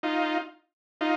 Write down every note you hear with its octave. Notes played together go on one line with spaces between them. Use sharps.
D#4 F4
D#4 F4